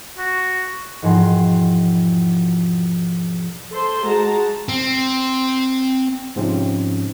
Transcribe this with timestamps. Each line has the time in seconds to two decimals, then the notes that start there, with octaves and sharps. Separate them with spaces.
0.17 F#4
1.02 E1 G#2 F3 F#5 G#5 C6
3.71 A4 C5 C6
4.04 G#3 F#4 A5 A#5
4.69 C4
6.36 G#2 C3 F3 C4 C#4